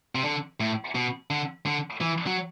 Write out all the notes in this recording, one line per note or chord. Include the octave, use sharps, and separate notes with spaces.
C3
D3
A2
B2
D3
D3
E3
F#3